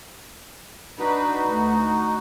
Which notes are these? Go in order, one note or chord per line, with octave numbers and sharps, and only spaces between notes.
D4 D#4 F#4 B4
D2